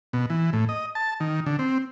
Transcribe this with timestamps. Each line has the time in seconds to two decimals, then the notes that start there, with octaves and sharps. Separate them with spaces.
0.13 B2
0.30 E3
0.53 A2
0.69 D#5
0.95 A5
1.20 D#3
1.46 D3
1.59 C4